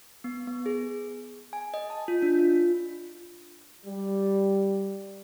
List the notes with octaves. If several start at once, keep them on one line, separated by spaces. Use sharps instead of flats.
B3
B3
G#4
G#5
D#5
A5
F4
D4
F4
G3